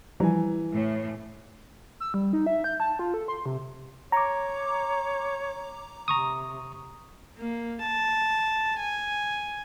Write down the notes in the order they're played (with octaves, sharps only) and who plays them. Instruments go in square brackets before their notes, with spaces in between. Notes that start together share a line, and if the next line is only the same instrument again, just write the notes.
[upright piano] E3 G#5 [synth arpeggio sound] F3 G3 A#5
[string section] A2
[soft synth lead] E6
G3
D#4
E5
G6
A5
F4
A4
C6
C3
[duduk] C#5 [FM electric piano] A#5 D6
[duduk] C3 [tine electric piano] A#5 C#6 D#6
[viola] A#3
A5
G#5